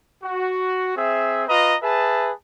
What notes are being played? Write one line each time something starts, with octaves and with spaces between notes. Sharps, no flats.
F#4
C4 G#4 E5
F4 B4 D#5 A#5
G#4 B4 E5 A5